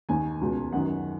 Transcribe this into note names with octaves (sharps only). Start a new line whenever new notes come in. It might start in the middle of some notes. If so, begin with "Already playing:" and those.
D#2 D#3 G#5
C#2 B2
F#2 D#3 F#5